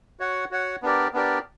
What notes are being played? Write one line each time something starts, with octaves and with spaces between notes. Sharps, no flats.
F#4 C#5 F#5
F#4 C#5 F#5
B3 D4 G4 A#4 D5
B3 D4 G4 A#4 D5